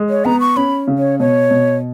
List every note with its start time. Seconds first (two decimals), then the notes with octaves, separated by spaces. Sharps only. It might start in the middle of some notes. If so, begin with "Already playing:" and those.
Already playing: G#3
0.10 C#5
0.25 B3 A#5
0.40 C#6
0.57 C#4 B5
0.88 C#3
0.98 C#5
1.19 B2 C#5
1.51 B2